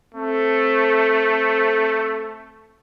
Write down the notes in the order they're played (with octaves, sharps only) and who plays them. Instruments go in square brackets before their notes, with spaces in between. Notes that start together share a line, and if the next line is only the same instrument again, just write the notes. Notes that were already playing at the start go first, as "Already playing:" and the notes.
[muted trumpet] A3 [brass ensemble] C4 A4